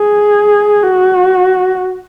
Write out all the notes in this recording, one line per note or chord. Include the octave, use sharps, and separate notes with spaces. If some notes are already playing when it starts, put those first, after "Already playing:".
Already playing: G#4
F#4